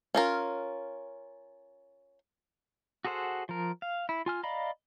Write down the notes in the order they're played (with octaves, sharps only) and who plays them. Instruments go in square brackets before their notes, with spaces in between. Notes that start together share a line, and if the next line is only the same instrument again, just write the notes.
[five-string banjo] C#4 F4 A#4
[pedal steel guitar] F#4 G#4 A4 C5 F#5
F3 A#4
F5
E4
F4 G#5 F6
D5 D#5 F5 A#5 B5